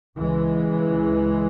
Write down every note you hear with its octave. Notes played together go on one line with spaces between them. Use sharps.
C#2 C#3 E3 G#3